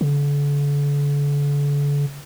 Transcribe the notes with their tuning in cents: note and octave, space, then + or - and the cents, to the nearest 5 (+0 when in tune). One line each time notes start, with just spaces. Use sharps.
D3 -40